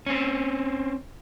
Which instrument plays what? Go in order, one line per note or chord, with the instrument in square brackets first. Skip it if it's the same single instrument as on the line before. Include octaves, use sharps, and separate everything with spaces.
[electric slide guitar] C4 C#4